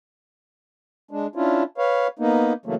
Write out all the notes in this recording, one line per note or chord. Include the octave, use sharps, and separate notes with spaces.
G#3 D4
C#4 D4 E4 F4
B4 C#5 F5
A#3 B3 D#4
C#3 E3 F#3 A3 A#3